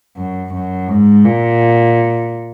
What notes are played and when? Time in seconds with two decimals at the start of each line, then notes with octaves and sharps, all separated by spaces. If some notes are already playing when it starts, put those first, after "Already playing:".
0.17 F#2
0.53 F#2
0.88 G#2
1.24 A#2